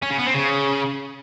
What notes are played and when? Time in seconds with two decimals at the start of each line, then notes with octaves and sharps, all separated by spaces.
0.02 C#4
0.10 C#3
0.18 B3
0.26 C4
0.34 C#3